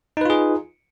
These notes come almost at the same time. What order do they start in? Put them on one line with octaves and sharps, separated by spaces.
D#4 B4 F4 G#4